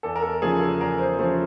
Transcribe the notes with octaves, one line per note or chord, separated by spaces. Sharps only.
E2 A4
A#4
A4
C#3 F3 A3 G#4
A4
E2 A#4
C5
C#3 F3 A3 C5